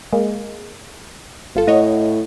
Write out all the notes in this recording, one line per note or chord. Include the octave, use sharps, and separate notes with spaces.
G#3 A#3
G1 F4 A4
A2 C#5 D#5 F#5